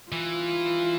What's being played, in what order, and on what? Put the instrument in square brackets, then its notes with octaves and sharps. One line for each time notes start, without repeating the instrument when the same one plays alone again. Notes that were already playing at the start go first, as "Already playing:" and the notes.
[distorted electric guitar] E3 [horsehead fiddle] F4